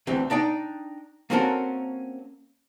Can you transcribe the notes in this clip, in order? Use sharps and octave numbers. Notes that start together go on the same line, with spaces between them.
D2 E3 C4
D4 D#4 D5 G5
A#3 C4 C#4 F#4 A4 A#4